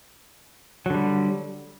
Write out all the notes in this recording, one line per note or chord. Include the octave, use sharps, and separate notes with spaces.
D3 F#3 G3